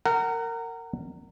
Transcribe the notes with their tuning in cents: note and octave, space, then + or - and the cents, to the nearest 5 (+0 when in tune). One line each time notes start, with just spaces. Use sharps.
A#4 -20 F#5 +25